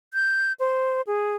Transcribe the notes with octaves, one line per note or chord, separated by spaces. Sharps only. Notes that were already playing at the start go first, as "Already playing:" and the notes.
G6
C5
G#4